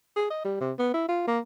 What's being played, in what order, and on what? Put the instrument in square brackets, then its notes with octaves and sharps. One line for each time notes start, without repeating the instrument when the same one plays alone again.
[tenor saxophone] G#4
D#5
G3
C3
B3
E4
F4
A#3